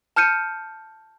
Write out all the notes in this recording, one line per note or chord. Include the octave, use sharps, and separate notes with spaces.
A5 F6 G6 C#7 D#7